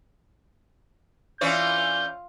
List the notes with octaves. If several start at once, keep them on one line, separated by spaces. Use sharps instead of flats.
E3 C#4 F4 D5 F5 G6